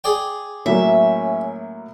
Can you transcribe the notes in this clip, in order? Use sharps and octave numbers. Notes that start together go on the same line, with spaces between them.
G#4 D5 G5
A2 F#3 A#3 C#4 E5